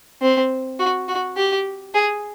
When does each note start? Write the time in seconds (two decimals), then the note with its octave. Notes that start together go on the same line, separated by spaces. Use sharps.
0.21 C4
0.79 F#4
1.08 F#4
1.37 G4
1.94 G#4